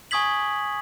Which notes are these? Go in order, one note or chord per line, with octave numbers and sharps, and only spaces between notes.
G#5 C#6 D#6 G#6 B6 F#7